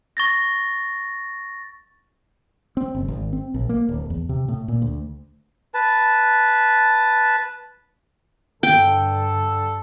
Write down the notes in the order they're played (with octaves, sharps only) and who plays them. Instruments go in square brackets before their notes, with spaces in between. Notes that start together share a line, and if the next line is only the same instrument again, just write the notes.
[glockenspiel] C#6 A6 A#6
[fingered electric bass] C4
F#1
G#1
C4
A#1
A#3
D1
E2
C3
A2
A#2
D2
[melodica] B4 A5
[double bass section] G2 D3 [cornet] A4 [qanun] G5